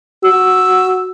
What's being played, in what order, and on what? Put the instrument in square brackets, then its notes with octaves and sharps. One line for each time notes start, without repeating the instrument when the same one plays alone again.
[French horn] F#4 [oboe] E6